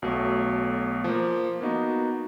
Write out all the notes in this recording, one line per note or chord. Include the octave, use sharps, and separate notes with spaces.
B1 B2 F#3 A3
F3 A#3
A#3 B3 D#4 F#4